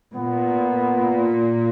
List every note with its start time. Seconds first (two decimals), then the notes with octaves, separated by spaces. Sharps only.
0.15 A#2 B3